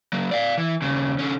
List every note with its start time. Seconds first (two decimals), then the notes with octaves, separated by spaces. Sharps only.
0.13 F#3 A#3
0.31 D5 F5
0.58 E3
0.82 D#2 C#3
1.19 D3 C#4